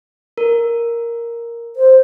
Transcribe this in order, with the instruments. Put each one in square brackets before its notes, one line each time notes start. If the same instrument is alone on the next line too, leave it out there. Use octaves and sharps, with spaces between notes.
[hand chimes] A#4
[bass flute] C5